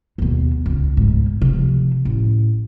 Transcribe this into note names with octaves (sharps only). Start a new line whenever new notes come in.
D#2 B2
C#2
G#2 B2
C3 F3
A1